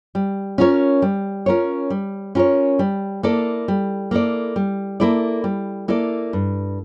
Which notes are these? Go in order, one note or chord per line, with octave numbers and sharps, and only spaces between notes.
G3
C#4 F4 A#4 C#5
G3
C#4 F4 A#4 C#5
G3
C#4 F4 A#4 C#5
G3
A#3 E4 A4 D5
G3
A#3 E4 A4 D5
G3
A#3 E4 A4 D5
G3
A#3 E4 A4 D5
G2